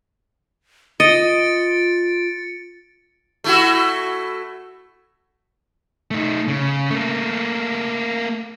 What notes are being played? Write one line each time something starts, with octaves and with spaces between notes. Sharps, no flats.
F4 D#5 A6 C#7 D7
A3 E4 F#4
A3 D#4
C#3
A3 A#3